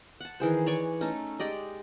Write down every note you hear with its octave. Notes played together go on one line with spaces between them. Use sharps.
F#5 A5
D#3 E3 G#4 C5
C#5 D5 G#5
A3 C#4 D#4 A4
G#3 G4 D5 D#5